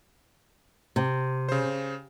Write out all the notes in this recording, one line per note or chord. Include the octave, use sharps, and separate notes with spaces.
C3
C#3 C5